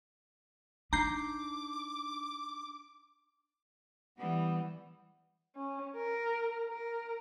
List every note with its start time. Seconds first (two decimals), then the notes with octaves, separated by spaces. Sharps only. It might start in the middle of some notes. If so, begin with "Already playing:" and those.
0.93 D4 D#4 A#5 D6 G6 C7
4.18 E3 G3 B3
5.56 C#4
5.96 A#4
6.69 A#4